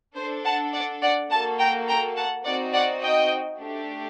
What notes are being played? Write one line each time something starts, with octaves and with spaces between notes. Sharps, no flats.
D4 A4 C5
F#5 A5
D5 F#5
D5 F#5
A#3 F#4 A4 F#5 A5
G5 A#5
G5 A#5
F#5 A5
C4 D#4 F#4 D5 F#5
D5 F#5
D#5 G5
A3 D4 G4